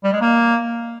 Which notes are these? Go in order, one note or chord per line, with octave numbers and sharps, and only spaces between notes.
G3
G#3
A#3